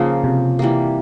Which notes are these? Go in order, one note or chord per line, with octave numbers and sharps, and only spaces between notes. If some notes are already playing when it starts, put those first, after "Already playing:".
Already playing: C#3 F3 A#3 D#4
C3
E3 G3 A#3